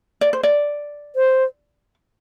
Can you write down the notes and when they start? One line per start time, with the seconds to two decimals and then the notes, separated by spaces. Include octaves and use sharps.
0.21 D5
0.33 C5
0.43 D5
1.16 C5